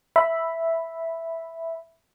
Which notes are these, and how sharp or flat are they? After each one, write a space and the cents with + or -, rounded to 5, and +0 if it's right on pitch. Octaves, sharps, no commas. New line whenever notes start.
E5 +0 B5 +0